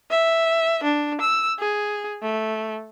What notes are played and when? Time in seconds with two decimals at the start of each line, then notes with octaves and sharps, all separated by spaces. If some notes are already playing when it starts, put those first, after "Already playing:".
0.11 E5
0.83 D4
1.21 E6
1.59 G#4
2.22 A3